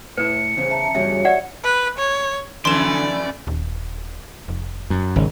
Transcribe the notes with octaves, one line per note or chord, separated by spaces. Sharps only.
A2 E4 B4 C#7
E2 C#3 C5
E5 A5 A#5
E2 G2 C#3 F#4 C#5 E5
G4 D5 E5 F#5
B4
C#5
F2 D3 E3 A3 D5 C6 E7
D#1
F1
F#2
G#1 C#3